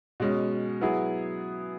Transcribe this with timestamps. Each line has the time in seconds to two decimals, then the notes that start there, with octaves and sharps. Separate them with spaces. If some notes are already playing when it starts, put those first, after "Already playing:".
0.20 B2 G#3 C#4
0.81 F#3 B3 E4 G#4